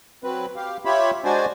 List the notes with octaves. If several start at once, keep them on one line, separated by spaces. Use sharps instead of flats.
F#3 C4 B4
G4 F5
F4 G4 C#5 E5 B5
G#3 D4 F#4 C5 D5 G#5